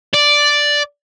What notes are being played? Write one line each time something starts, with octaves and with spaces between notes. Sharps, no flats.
D5